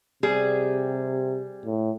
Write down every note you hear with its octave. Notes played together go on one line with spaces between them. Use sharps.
C3 G3 G#4
A2